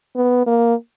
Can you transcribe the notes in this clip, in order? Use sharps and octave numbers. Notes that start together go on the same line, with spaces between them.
B3
A#3